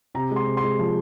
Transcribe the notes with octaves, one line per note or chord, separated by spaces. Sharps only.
C3 A#5
G#3
C6
C3
C6
G#3
F3